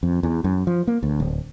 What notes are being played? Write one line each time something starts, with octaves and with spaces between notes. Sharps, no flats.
F2
E2
F#2
F3
A#3
D2
D1